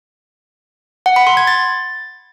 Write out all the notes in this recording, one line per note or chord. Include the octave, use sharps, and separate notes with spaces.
F#5
B5
C6
G#6
A6